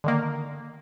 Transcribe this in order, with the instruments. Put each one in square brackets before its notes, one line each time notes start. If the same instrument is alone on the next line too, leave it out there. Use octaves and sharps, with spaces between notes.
[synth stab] D3 D#3 A#3